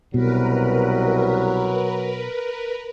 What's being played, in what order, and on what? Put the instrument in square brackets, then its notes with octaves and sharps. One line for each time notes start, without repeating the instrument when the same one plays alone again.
[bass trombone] C2 [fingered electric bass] B2 [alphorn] F#3 [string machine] A#4 B4